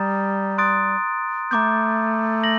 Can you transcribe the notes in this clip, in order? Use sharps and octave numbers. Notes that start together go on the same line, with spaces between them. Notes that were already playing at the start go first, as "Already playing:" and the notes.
Already playing: G3 A#5 D#6 A6
C6 D#6 F#6 A6 D7
A3 B3 A#5 D6 G6
A#6 F#7